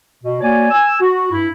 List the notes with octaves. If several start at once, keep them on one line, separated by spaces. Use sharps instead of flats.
B2
A#3 F#4 C#5 D5 G#5
G#5 E6
F#4
G2 E4